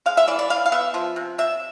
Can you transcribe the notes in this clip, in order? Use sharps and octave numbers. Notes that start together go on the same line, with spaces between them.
G#3 F5
E5
E3 D5
D5
E3 F5
F5
B3 E5
F3
C3
C3 E5